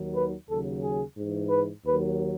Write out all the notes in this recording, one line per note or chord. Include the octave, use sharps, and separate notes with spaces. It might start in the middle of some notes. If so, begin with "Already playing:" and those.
Already playing: D#2 D#3 F#3
B4
D#2 C#3 F#3 A4
G#4
G#2 E3
B4
D#2 D#3 F#3 B4